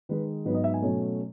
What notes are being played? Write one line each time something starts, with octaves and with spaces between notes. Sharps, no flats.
D#3 G#3 D#4 B4
G#2 F#3 B3 D#4 B4
D#5
E5
G#5
B2 F#3 A3 C#4